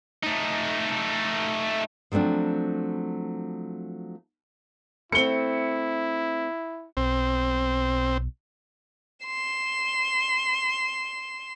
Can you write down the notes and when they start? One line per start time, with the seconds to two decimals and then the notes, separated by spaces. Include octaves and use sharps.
0.23 A3 D#4
2.12 F3 F#3 A3 C4 D4
5.12 A3 C4 E4 C#7 G7
6.97 B1 C4
9.25 C6 E7